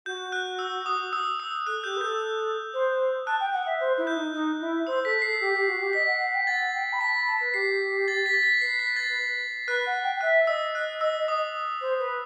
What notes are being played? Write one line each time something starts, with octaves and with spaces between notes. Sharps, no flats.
F#4 G6
F#6
E6
D#6
E6
E6
A4 F#6
G4 G6
B4
A4 G6
C5
A5 F#6
G5
F#5
E5
C5
E4
G6
D#4
D#4
E4
C5 E6
A4 B6
A4 C7
G4
G4
F#4
G4
D#5 B6
F#5
F#5
G5
F#5 A6
G5
B5
A5 B6
B5
A5
B4
G4 C7
A6
B6
A6
B6
B4 C7
B6
A6
B4 F#6
F#5
G5
E5 F#6
D#5 E6
F#6
E6
D#6
C5
B4